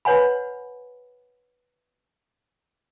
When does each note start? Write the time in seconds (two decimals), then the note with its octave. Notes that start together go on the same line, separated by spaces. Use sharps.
0.05 B4 C#5 F#5 G#5 B5